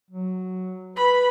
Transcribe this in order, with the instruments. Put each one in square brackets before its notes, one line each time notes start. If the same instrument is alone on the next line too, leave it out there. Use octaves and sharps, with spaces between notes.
[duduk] F#3
[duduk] B4 [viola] B5